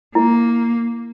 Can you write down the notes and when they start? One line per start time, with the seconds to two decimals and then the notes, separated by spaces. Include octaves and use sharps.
0.15 A#3 E4